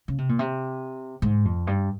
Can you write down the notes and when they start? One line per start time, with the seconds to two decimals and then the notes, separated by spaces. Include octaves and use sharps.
0.08 C#3
0.18 C3
0.29 A#2
0.39 C3
1.22 G#2
1.45 F2
1.67 G2